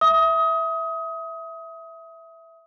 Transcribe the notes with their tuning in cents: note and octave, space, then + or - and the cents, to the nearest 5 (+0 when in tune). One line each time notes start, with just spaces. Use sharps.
E5 +0 D#6 +25